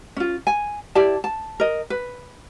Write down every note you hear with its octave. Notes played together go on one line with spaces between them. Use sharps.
C#4 F4
G#5
E4 G4 D5 A5
A5
A#4 D#5
B4